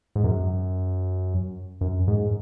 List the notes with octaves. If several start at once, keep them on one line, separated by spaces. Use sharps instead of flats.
G#2
F#2
F#2
G#2